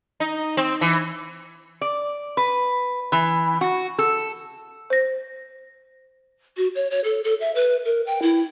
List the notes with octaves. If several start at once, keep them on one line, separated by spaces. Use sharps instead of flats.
D#4
C4
E3
D5
B4
E3
F#4
A4
C5 A#6
F#4
C#5
C#5
A4
A4
E5
B4
A#4
G5
E4